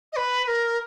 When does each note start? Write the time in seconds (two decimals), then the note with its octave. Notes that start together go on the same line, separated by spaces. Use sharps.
0.12 D#5
0.16 B4
0.44 B4
0.47 A#4